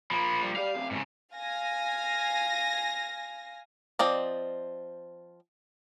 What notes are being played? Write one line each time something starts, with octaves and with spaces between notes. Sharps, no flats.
F3 A#3 B5
G3
G4 D5 F5
F#2 C3
G#2 C#3
F5 G#5 A#6
F3 C4 D5 D#5